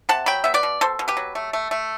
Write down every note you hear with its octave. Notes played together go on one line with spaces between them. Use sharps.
C3 F#5 A5
F#3 G5 B5
B3 E5
B4 D5
B2
B2 A4 C5
B2
G4 B4
F#3
A3
A3
A3